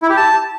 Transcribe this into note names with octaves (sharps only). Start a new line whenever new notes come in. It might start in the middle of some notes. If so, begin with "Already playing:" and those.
E4
G4
A5